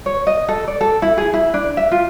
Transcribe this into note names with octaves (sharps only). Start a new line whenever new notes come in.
C#5
D#5
A4
D5
A4
E4
G#4
E4
D4
E5
F4